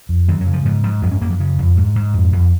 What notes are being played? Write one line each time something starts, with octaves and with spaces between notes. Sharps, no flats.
F2
F#2 D#3
F#3
C#3
F3
G#2 F3
G#2 F3
F#2 F3
C#4
F#2 A#3
F3
C#3
F2
G#2
G#2
F2
F2